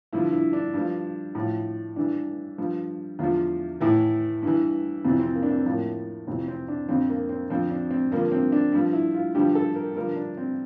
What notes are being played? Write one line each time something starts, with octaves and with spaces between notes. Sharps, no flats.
G2 D3 F3 E4
E4
D4
G2 F3
A2 F3
G2 E3 D4
G2 F3
E2 D3 F3 F4
A2 E3 E4
G2 E3
F2 C3 E3 C4
C4
A#3
D4
C4
A2 F3 A#3
F2 C3 E3 C4
C4
D4
F2 D3 F3 C4
A#3
C4
F2 D3 F3 C4
D4
C4
G2 D3 F3 A#3
C4
D4
G2 F3
E4
F4
G2 D3 F3 G4
A4
A#4
G2 D3 F3 A#4
D4
C4